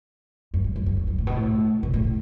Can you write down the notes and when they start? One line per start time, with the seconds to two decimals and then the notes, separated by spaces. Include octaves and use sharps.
0.54 F#2
0.64 G2
0.76 F#2
0.86 F#2
0.97 E2
1.07 F#2
1.18 A2
1.27 B2
1.36 A2
1.83 B2
1.94 A2